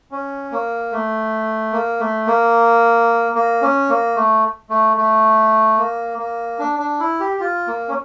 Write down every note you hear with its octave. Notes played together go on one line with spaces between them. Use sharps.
C#4
A#3
A3
A#3
A3
A#3
A#3
C#4
A#3
A3
A3
A3
A#3
A#3
D4
D4
E4
G4
F4
A#3
C#4